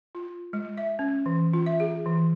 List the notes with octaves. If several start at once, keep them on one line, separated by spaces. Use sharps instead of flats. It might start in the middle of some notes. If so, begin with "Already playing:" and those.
F4
G#3
E5
C#4
E3
F4
E5
G#4
E3